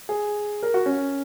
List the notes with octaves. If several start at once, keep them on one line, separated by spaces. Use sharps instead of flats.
G#4
A#4
F#4
C#4